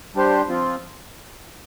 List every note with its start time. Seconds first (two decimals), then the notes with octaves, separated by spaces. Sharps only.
0.15 G3 D4 G4 C5
0.49 F3 C4 F4